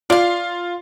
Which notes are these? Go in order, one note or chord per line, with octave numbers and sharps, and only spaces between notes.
F4 D5 F5